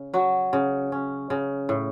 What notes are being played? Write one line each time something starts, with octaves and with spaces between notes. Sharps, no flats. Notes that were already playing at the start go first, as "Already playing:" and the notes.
Already playing: C#3
F#3 F#4
C#3
C#4
C#3
A2